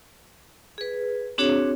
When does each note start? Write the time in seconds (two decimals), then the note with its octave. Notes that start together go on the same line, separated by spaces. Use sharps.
0.78 G#4 B4
1.38 C4 D4 F#4 G#4 C#5